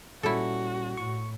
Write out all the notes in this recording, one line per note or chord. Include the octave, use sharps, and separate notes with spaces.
A#2 G3 C#4 E4 F#4 A4
A2 C#6